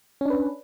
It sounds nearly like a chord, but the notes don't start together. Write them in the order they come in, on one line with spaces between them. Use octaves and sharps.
C#4 D4 B4